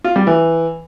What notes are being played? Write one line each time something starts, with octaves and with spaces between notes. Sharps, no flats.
F4
G3
E3